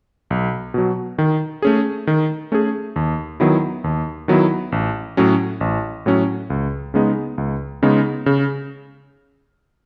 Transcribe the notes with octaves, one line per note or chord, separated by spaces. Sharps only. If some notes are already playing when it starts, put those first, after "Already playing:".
B1
B2 F#3
D#3
A3 C#4 G#4
D#3
A3 C#4 G#4
D#2
D#3 F#3 B3 E4
D#2
D#3 F#3 B3 E4
A1
A2 F#3 C#4
A1
A2 F#3 C#4
C#2
C#3 G#3 B3 D#4
C#2
C#3 G#3 B3 D#4
C#3